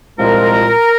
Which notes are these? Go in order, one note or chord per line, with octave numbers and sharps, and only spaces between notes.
C2 A#2 F3 G#3 A#4